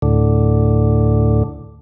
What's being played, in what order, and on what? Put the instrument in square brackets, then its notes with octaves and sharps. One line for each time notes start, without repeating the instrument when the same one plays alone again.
[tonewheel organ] D2 A2 D3